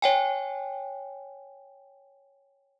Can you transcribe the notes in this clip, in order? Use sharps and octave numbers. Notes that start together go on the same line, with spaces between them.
C#5 G5 G#5